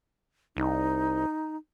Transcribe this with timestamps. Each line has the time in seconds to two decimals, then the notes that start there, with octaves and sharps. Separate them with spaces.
0.57 C2 D#4